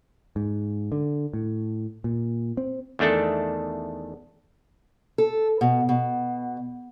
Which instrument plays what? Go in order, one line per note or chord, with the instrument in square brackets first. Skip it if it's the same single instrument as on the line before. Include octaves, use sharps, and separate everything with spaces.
[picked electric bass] G#2
D3
A2
A#2
C4
[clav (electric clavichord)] E2 D#3 A3 D4 A4
[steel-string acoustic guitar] A4
B2
B2